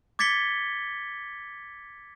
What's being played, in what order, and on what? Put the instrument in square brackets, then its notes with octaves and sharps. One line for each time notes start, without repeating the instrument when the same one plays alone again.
[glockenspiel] D6 G#6 A6 B6 C#7 G7